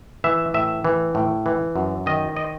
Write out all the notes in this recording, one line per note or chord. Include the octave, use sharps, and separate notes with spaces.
E3 E5
A2 E5
E3
A2
E3
F#2
D#3 D#5
D#5